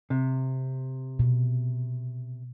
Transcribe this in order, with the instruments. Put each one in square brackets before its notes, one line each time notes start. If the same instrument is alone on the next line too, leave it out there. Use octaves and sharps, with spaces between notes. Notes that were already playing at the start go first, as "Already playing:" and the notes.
[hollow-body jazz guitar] C3
[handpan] B2